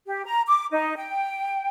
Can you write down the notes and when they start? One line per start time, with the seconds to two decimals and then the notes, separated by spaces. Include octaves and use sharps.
0.07 G4
0.25 A#5
0.47 D6
0.71 D#4
0.97 G5